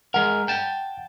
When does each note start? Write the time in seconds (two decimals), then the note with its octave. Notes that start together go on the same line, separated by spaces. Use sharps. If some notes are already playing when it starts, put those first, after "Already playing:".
0.14 G#3 A#4 F#5
0.48 G5 A5